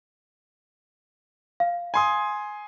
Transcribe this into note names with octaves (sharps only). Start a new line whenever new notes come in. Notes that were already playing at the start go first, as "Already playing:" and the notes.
F5
G#5 C6 D#6